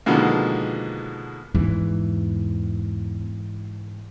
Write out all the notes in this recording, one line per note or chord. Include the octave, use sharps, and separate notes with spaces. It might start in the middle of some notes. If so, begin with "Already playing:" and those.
B2 D3 D#3 F3 G#3 A#3
E2 G#2 E3